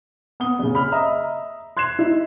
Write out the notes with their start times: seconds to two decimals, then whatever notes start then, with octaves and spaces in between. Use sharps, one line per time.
0.40 B3 D#6 G7
0.59 F#1 C#3
0.75 B5 F6
0.92 D#5 E5 A#5 D#6
1.77 C6 F#6 G#6 C7 E7
1.99 D#4 E4